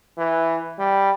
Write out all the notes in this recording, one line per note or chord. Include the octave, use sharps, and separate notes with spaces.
E3
G3